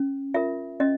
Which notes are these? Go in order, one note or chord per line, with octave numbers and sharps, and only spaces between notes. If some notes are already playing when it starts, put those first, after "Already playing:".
Already playing: C#4
F4 A#4 E5
C#4 D#5